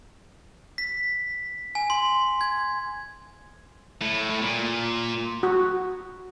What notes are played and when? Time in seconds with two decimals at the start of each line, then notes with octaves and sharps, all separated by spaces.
0.78 B6
1.75 G#5
1.90 C6
2.41 G#6
4.02 A2
4.30 A2
4.42 A#2
5.43 F#4